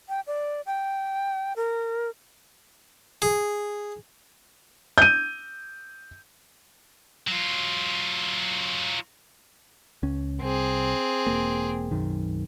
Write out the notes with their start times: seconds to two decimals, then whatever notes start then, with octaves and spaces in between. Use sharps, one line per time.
0.09 G5
0.27 D5
0.66 G5
1.56 A#4
3.22 G#4
4.98 G6 D#7
7.28 F#3 F4
10.03 C#2 C#4
10.42 C2 C4 G#4
11.27 E1 A#3
11.91 B1 F#2 D#3